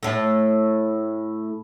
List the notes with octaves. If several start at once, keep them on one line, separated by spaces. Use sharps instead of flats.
A2 A3